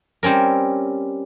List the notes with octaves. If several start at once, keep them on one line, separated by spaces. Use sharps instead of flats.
G3 C4 C#4 A#4